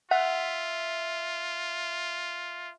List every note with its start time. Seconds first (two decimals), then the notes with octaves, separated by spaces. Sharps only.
0.11 F4 E5 F#5